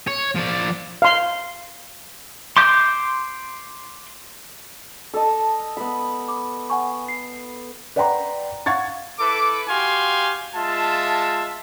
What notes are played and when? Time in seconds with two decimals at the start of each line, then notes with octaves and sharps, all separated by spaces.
0.08 C#5
0.36 F3 D5
1.02 F5 C6
2.57 C6 D6 G6
5.14 A4 D#5 A5
5.77 B3 B5
6.28 D6
6.70 F#5 G#5 C#6
7.08 C7
7.96 B4 D5 F#5 G5 A#5 C6
8.66 F5 F#5 C#6 G#6 A6
9.19 E4 A4 B4 D6
9.68 F#4 G4 F5 G#5 C6
10.55 G#3 F4 E5 A5